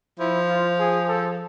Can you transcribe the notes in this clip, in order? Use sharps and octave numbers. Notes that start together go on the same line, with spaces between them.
F3 E4
F4
G#4
A4